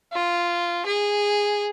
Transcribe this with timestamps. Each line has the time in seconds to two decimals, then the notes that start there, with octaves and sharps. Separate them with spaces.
0.13 F4
0.86 G#4